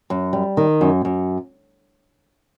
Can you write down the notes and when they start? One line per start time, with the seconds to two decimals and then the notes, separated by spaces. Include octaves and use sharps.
0.10 F#2
0.33 G3
0.57 D#3
0.81 F#2
1.05 F#2